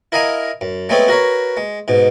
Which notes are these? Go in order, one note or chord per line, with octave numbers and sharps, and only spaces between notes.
E4 A#4 D#5 F5 G#5 A#5
F#2
G#3 A3 B3 C4 A4 C#5
F#4 A#4 B4 C#5
G#3
G#2 B2